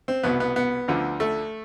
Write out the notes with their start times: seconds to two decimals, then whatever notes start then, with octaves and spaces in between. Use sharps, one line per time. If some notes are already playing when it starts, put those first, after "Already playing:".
0.08 C4
0.23 C2 B2 B3
0.40 B3
0.56 B3
0.88 D2 D3 F3
1.20 A3